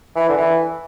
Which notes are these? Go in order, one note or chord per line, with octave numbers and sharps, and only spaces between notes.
E3
D3
E3